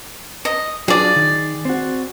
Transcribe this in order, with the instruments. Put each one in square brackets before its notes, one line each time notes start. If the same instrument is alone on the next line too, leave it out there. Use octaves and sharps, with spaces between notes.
[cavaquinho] D#5
[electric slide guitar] F#3 D4 F4 [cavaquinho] G#4 D5
[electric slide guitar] D#3
C4 F#4